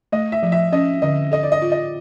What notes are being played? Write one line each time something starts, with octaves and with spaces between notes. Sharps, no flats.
A3 D#5
E5
F3
E5
C#4 D#5
D3 D#5
A4 D#5
D5
D#5
F4
D#5